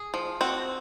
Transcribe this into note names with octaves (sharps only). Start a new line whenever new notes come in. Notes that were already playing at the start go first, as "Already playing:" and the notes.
Already playing: G#4
F3
C4 F#4